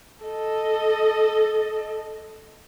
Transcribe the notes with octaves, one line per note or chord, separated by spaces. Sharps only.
A4 D#5